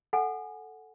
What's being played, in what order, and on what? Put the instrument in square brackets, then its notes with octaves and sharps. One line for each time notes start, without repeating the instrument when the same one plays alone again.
[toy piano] A4 F#5 G#5